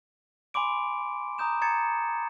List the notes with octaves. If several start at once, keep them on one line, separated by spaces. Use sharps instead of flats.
G#5 B5 C6 D6 D7
A#5 D#6 G6 E7
A#5 G#6 A6 C#7 E7